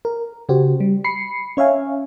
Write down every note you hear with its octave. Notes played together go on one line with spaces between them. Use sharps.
A#4
C#3 F#4 G4 C5
G3
B5 C7 C#7
C#4 C#5 E5 F5 G#5